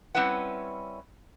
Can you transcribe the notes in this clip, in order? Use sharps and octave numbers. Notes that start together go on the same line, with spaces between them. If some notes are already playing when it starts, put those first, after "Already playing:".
G3 C4 C#4 E4 B4 F#5